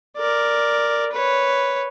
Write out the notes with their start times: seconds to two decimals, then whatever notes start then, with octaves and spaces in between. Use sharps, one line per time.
0.17 A#4 D5
1.13 B4 C#5